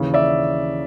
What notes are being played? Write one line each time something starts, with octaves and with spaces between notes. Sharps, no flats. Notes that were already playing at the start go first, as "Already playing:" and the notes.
Already playing: D#2 C#3 E3
D5 E5